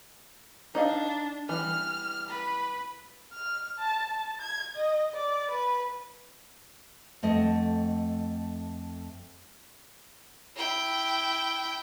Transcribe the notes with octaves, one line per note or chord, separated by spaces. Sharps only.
D4 D#4 D#5 F5
E3 G3 F6
B4
F6
A5
A5
G#6
D#5
D5
B4
F2 A3 D#5 F#5
E4 G5